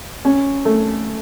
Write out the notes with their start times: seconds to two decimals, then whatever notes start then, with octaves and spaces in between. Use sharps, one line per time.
0.25 C#4
0.65 A3